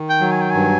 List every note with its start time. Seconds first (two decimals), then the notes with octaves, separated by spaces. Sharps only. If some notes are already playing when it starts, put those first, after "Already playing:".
Already playing: D#3
0.10 G5
0.21 F#3
0.31 G#5
0.41 G5
0.50 G2 G#5